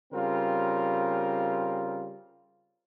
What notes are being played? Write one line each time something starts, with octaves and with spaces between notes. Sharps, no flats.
C#3 G3 C4 F4 A#4